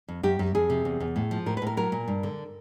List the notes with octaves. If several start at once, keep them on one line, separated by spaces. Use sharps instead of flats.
F2
F#2 G4
F#2
F2 G#4
C3
E2
E2
A2
F3
A2 A#4
B4
A2 A#4
F#3 A#4
A#2
G2
D3